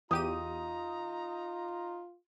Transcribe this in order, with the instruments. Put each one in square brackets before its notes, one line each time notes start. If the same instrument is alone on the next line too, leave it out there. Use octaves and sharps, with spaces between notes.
[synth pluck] E2 G4 D#7 [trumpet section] D#4 A#5 [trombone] F4 [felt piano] D#6